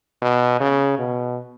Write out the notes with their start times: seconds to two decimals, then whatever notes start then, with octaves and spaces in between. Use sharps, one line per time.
0.22 B2
0.60 C#3
0.99 B2